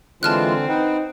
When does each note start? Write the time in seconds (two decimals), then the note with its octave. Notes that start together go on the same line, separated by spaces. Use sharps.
0.23 D3 E3 G#3 C4 F4 A5 F6 F#6
0.69 D#4 B4 F#5 G5